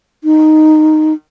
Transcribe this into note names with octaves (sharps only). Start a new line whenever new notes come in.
D#4